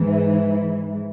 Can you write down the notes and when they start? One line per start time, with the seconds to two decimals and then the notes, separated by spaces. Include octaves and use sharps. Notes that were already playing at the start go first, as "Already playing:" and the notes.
Already playing: G#2 E3